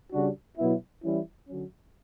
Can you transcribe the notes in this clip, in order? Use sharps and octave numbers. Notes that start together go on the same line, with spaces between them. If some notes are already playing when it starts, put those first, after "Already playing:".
C#3 G3 D4 F#4
B2 F#3 B3 E4
E3 G3 C#4 E4
D3 F#3 C#4